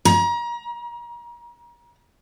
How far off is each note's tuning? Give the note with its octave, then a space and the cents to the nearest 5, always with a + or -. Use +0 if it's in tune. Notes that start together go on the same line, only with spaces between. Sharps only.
A#5 +35